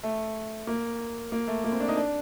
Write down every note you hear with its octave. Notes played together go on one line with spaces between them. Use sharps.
A3
A#3
A#3
A3
A#3
C4
D4
D#4
D4